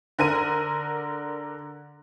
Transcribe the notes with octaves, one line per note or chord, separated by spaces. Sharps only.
D3 A#4 D#7